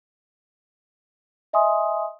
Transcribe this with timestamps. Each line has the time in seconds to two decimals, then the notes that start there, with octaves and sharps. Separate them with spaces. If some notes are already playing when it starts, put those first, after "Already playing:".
1.53 D#5 E5 G#5 C6 D#6